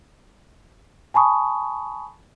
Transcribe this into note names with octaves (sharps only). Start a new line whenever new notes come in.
G#5 A5 B5 C#6 D#6